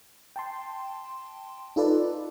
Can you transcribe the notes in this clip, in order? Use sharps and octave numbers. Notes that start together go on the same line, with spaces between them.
G5 A5 C6
D#4 F4 A4 B4 D5